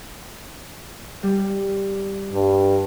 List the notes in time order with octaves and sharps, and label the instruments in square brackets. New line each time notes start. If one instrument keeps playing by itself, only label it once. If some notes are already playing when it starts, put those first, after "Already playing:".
[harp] G3
[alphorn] G2